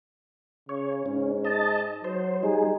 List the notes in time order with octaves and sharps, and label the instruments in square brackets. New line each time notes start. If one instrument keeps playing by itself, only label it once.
[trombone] C#3 [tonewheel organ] C#5
[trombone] G#2 [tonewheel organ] C#4
[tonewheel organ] D#5 A5
[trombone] F#3 [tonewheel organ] C5
[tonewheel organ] G3 G#4 [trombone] D#4